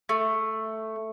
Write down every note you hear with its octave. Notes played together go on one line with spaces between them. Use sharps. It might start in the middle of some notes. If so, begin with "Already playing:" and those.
A3